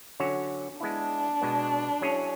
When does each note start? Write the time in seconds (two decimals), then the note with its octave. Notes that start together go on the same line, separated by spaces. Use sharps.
0.20 D3 F#3 C#4 F#4 C#5
0.80 G#3 B3 D4 E4
1.41 B2 G#3 B3
2.01 F#3 C#4 E4 G#4 C#5